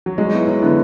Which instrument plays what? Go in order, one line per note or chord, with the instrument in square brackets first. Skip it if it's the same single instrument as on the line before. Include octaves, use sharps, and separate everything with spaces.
[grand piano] F#3
[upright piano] F#3 [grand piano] G#3
[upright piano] B3 E4
F#3
[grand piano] D3 [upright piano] B3 E4